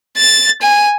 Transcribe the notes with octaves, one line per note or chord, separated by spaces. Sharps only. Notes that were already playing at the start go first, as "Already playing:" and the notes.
A6
G#5